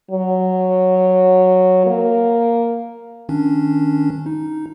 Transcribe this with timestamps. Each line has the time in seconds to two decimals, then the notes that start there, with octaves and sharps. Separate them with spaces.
0.11 F#3
1.87 A#3
3.29 D#3 C#4 D4
4.26 D#4